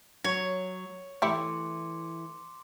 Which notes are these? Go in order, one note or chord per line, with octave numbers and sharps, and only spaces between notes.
F#3 C#5
E3 A3 E4 G4 C6 D6 C#7